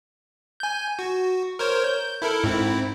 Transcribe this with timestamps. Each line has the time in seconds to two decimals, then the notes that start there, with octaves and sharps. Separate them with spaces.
0.60 G#5 G6
0.99 F#4
1.59 A#4 C5 C#5
1.84 G6
2.22 E4 A4 A#4
2.44 G#2 C4 E4